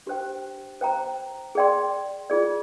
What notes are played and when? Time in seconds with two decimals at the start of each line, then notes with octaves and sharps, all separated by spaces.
0.06 D4 G4 C5 G5
0.81 C5 G5 A#5
1.55 G#4 D5 G5 C6
2.30 F4 G#4 D5